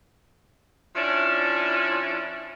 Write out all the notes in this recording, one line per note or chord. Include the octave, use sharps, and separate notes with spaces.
F3 C#4 D4 E4